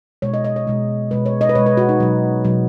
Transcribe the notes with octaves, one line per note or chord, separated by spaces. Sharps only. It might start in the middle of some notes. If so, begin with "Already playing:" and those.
B2 G#3 C#5
D#5
D#5
C#5
B2 G#3
B2 G#3 B4
C#5
D#5
B4
B2 G#3 C#5
B4
F#4
D#4
B2 F#3
B2 F#3